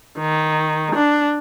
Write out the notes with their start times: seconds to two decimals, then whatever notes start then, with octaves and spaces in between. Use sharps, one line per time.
0.19 D#3
0.95 D4